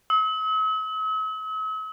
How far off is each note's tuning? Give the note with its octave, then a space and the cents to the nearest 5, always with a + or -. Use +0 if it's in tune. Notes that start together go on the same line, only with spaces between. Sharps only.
E6 -45